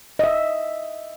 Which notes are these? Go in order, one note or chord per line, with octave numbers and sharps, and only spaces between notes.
D#5 E5